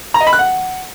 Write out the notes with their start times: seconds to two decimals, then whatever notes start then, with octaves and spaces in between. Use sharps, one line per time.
0.14 A#5
0.21 D#5
0.27 B5
0.33 F#6
0.39 F#5